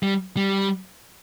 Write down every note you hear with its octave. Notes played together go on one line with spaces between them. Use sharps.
G3
G3